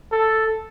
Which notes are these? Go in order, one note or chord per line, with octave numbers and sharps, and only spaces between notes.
A4